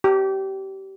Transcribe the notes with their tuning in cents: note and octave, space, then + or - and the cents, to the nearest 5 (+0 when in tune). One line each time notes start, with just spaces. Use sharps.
G4 -25